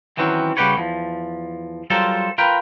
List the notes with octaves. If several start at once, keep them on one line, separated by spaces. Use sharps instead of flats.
D#3 E3 F#3 C4 C#4 F#4
C#3 G3 F#4 G4 B4 C#5
E2 F3
F#3 G3 F4 A4 A#4 C5
F4 A#4 B4 G5